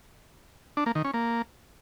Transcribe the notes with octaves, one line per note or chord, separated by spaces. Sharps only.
D4
A#3
D#3
C#4
A#3